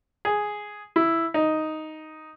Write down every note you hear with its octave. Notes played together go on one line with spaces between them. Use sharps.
G#4
E4
D#4